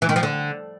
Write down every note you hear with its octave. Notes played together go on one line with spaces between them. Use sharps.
E3
D#3
F3
D3